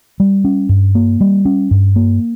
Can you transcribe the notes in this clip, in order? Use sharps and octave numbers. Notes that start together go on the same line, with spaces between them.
G3
C#4
G2
A#3
G3
C#4
G2
A#3